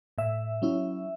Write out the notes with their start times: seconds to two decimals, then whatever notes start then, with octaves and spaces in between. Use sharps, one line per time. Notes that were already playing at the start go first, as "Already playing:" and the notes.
0.18 A2 E5
0.62 F#3 C#4 E4